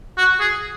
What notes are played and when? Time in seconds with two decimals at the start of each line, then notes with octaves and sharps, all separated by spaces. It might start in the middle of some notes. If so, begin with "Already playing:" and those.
0.17 F#4
0.40 G#4